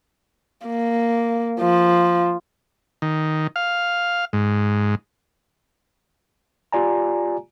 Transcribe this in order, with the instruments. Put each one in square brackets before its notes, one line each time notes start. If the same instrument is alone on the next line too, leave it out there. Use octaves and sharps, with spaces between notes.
[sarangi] A#3
F3
[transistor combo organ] D#3
F5
G#2
[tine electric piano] F4 G4 D5 G#5 A#5